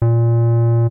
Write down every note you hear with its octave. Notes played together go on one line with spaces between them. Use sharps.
A#2